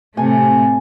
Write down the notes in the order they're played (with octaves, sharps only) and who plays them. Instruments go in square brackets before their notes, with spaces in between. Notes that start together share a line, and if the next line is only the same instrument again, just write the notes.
[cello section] A2 C3 A3 [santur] G#5 A5